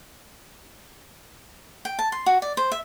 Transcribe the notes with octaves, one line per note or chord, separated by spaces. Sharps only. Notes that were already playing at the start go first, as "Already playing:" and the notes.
G5
A5
C6
F#4
D5
C5
E5